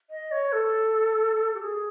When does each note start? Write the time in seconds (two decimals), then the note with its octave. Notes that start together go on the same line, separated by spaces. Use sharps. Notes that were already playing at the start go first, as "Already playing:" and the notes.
0.10 D#5
0.31 C#5
0.53 A4
1.54 G4
1.61 G#4